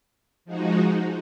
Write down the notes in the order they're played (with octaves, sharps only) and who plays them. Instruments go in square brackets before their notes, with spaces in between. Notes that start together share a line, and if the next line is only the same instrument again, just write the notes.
[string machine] F3 G#3 D#4 F#4